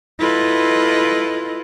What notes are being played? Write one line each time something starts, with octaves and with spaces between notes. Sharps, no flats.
E4 F4 A4 B4 D#5